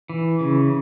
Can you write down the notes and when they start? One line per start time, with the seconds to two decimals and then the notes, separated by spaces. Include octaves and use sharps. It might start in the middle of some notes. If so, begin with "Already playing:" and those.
0.09 E3
0.41 C#3